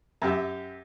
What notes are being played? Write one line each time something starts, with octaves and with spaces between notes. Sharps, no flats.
F#2 G4 E5